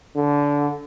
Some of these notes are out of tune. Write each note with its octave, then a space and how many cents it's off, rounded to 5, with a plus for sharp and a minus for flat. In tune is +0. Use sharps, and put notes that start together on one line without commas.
D3 -20